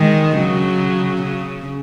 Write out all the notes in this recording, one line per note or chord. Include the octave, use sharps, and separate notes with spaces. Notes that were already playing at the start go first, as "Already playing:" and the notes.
Already playing: D#3 G#3
C#3 F#3
C#3